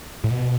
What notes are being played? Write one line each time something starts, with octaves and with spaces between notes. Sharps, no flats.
A2
B2